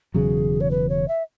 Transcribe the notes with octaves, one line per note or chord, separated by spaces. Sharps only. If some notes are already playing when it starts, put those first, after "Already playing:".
E1 E2 C#3 F#3 G#4
C#5
B4
C#5
E5